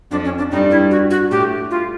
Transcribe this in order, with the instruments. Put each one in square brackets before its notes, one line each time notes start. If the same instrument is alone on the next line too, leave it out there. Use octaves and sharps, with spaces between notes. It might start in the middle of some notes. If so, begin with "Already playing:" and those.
[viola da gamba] F2 F3 [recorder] D4
[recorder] C#4
D4
[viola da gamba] G2 G3 [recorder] D#4
[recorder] E4
F#4
F#4
[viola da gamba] A2 A3 [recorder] G4
[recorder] F4